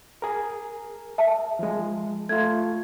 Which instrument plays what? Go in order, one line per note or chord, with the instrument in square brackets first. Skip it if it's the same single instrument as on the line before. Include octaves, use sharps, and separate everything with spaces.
[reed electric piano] G#4 A#4
[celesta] E5 A5
[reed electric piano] F3 G#3
[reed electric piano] A3 F4 [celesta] G#6